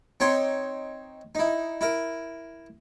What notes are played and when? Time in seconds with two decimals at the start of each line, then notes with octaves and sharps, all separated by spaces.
0.20 C4 D#4 C#5 G5 C6
1.35 D#4 E4
1.81 E4 A#4